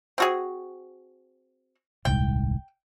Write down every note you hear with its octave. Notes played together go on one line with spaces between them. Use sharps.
C4 F#4 G#4
D#1 C2 G#2 G5